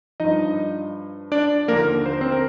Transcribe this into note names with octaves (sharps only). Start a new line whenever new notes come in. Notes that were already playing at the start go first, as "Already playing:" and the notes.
G2 F3 D#4 D#5
D4 D5
D#2 D3 F3 A#3 A#4
C5
A#4
C4 C5
A#4